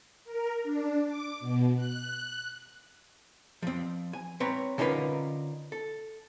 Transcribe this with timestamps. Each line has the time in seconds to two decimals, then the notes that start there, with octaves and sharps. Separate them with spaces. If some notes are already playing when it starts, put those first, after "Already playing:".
0.25 A#4
0.63 D4
1.05 D6
1.40 B2
1.76 F#6
3.62 F3 C4
4.13 G#5
4.40 C4 B4 C#5 A#5
4.78 D3 C#4 D#4 F4 A#4 B4
5.72 A4